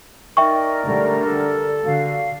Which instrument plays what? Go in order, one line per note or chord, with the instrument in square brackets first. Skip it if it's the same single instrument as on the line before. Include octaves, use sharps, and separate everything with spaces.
[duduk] D#4 [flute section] A#4 D5 [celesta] E5 G5 C#6
[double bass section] D3 G3 [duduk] A3
[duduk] A4
[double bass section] D3 [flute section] F#4 F5